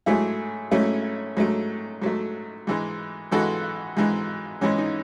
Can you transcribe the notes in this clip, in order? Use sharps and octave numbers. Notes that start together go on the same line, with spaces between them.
G#2 F#3 A3 E4 G#4
G#2 F#3 A3 C#4 E4
G#2 F#3 A3
G#2 F#3 A3
G#2 E3 G#3
G#2 E3 G#3 F#4 A4
G#2 E3 G#3
G#2 E3 G#3 C#4
D#4